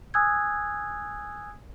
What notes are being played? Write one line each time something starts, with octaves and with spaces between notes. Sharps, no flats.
G#5 D#6 E6 F#6 G#6